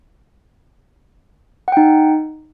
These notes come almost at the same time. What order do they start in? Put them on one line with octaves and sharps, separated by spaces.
F#5 G5 D#4